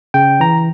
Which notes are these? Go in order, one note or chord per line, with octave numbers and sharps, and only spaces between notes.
C#3 G5
E3 A#5